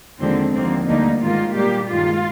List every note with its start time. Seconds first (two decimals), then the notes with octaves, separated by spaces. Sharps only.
0.20 D#2 D3 F3 G#3 C4
0.54 D#2 D3 F3 A#3 C4
0.88 D2 D3 G3 A#3 D#4
1.22 G#2 D#3 A#3 F4
1.55 A#2 G3 A#3 G4
1.89 G2 D#3 G#3 F4